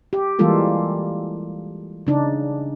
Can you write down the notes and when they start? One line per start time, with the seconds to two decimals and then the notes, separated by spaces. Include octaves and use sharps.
0.13 G4
0.39 E3 G3 G#3 A#3 F4 A4
2.07 C#3 D4 D#4